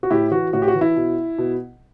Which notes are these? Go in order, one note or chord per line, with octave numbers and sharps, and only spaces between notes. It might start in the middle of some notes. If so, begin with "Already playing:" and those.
F#4
A2 E4 G4
E3 F#4
A2 F#4
G4
F#4
E3
E4
B2
B2